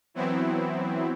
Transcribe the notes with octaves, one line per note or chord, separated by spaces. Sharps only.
E3 F#3 B3 C4 E4